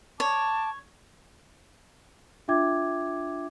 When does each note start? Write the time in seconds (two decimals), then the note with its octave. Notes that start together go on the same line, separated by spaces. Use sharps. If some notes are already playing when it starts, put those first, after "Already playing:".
0.20 C#5 A5 D6
2.48 D4 F4 E5 G5 D6 G#6